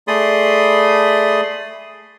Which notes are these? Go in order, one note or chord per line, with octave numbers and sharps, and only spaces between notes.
A3 G#4 D5 B5 C6 D#6